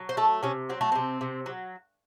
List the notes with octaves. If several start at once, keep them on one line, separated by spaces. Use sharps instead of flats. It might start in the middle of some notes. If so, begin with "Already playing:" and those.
Already playing: F#3
C5
A3 A4
C3 C#4
F#3 C4
A3
C3 C4
C3
F#3